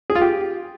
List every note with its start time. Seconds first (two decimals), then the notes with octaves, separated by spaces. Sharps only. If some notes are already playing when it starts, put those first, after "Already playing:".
0.10 G#4
0.15 F4
0.21 G4